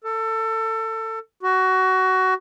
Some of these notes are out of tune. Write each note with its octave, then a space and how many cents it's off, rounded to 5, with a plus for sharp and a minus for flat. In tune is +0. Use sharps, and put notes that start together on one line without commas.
A4 +25
F#4 +20